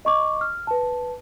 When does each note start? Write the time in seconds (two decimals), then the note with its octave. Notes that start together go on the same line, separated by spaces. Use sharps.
0.05 D#5 C#6 D6
0.41 F6
0.67 B4 A5